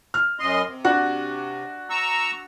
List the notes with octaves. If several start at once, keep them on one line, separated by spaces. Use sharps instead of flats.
F6
F#2 D#5 C6
C3
D4 F#4 F#5
A#5 C#6 E6